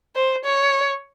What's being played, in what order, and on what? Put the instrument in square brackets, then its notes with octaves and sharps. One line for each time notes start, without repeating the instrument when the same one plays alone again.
[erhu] C5
C#5